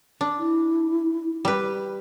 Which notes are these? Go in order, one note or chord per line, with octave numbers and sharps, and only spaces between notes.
D4
E4
G3 B4